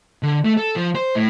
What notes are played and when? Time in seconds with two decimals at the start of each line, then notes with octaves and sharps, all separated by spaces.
0.23 D3
0.45 A3
0.57 A4
0.76 F3
0.95 C5
1.15 A2